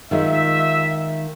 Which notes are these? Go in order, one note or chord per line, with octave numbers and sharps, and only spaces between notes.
D#3 G#3 D#4 F4 E5